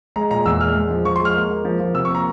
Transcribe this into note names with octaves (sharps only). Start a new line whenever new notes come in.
G#3 A#5
A#2 A#5
E2 E6
G#3 F6
G#3
F3
F3 C#6
C6
G#3 F6
A#3
A#3
F3
F3
C3 E6
C#6
A#3 A#5